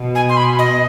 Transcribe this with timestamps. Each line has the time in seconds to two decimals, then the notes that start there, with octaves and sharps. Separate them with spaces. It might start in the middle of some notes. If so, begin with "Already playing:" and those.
Already playing: B2
0.15 G#5
0.29 C6
0.37 B5
0.59 D#5